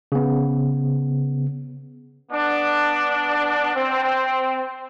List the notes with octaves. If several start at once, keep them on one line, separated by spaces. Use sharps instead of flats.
C#3 B3
B3 D4
C4